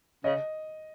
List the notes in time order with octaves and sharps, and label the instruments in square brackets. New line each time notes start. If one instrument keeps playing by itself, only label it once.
[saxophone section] C#3 [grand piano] D#5